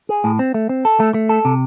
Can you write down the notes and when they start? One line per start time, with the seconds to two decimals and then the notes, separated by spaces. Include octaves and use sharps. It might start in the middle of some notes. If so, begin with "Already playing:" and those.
0.09 G#4
0.24 A2
0.39 C4
0.54 A3
0.69 C4
0.85 A4
1.00 A3
1.14 A3
1.29 A4
1.45 C3